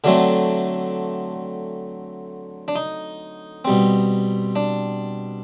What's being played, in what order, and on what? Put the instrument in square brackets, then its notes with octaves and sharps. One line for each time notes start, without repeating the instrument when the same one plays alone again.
[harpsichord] D3 F#3 A3 C4 D4
D4
D#4
B2 G3 C4
D4